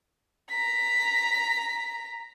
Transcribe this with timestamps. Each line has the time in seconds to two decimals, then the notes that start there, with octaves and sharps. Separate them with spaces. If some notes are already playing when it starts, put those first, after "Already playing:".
0.50 A#5 B6